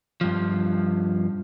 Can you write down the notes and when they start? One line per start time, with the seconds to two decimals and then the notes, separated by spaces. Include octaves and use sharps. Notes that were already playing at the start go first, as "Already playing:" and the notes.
0.21 G2 F3